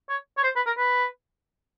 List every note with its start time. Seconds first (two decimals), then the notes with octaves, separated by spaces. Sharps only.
0.09 C#5
0.37 C#5
0.44 C5
0.56 B4
0.66 A#4
0.77 B4